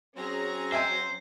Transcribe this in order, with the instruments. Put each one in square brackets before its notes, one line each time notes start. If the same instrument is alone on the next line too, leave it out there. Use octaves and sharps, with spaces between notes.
[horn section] F#3 C4 [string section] C#4 G#4 A#5
[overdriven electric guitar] C5 [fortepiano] E5 G5 G#5